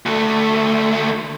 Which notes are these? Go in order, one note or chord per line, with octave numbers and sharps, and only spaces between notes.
D2 A3